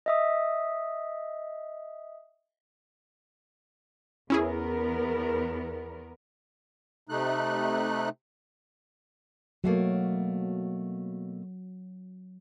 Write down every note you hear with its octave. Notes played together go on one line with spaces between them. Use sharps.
D#5 E5 D#6
E2 B3 C#4 E4 G#4 A#4
C3 A3 D#4 F#6
B2 F#3 A3 A#3